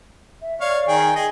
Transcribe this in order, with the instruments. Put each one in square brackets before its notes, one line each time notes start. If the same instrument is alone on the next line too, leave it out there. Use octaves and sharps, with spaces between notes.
[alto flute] E5
[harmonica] C#5 F5 [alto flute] D5
[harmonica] D#3 G#4 G5
[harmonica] G#4 D#5 [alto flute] G5